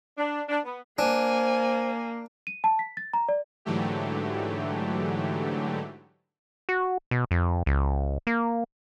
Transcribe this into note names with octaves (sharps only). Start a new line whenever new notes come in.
D4
D4
B3
A#3 D4 C5 G#5
D#7
A5
B6
A6
A#5
D5
G#2 D3 E3 F#3 A3 G4
F#4
B2
F2
C#2
A#3